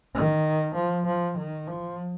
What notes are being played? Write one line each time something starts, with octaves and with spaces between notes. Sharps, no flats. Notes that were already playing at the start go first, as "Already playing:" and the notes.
D#3
F3
F3
D#3
F3